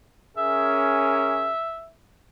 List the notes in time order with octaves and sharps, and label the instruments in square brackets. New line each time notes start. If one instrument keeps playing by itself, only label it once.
[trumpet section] C#4 G#4 A#4 [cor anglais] E5